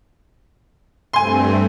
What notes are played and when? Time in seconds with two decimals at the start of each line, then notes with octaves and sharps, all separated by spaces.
1.13 G2 A3 C4 G#5 C6